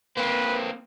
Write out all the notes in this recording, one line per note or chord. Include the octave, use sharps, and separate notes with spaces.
A#3 C4 B4